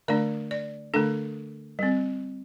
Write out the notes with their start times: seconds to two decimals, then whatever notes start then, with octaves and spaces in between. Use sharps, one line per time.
0.08 D3 A3 D4 D5
0.51 D5
0.94 D3 A3 D4 A4
1.79 G3 C4